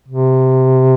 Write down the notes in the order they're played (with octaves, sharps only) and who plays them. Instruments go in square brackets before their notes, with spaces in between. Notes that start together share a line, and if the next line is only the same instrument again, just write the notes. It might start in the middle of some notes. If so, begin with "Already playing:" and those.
[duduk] C3